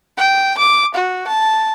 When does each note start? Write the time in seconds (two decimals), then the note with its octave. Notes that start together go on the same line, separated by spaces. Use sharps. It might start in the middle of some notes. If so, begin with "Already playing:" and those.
0.18 G5
0.58 D6
0.95 F#4
1.28 A5